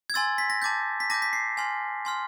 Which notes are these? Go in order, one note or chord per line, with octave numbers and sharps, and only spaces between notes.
G#6
G#5 C6 E6 A6
B6
A#6
A5 D6 G6 A6
B6
A5 D6 G6 A#6
B6
C7
G#5 C6 F6
G#5 C6 F6